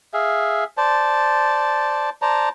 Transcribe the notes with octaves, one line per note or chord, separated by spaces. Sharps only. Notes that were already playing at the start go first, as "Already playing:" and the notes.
G#4 E5 F5
C5 D5 A5
C5 D5 A5 A#5